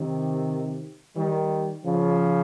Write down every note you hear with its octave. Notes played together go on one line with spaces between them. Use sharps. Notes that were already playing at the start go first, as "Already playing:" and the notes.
Already playing: C3 D#3
D#3 G3
C#3 F3